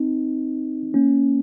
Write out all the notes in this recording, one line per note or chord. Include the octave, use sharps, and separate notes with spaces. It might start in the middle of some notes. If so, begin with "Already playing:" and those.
Already playing: C4 D#4
A#3 C#4